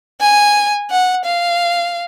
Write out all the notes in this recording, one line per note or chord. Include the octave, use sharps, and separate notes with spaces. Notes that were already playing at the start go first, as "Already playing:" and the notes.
G#5
F#5
F5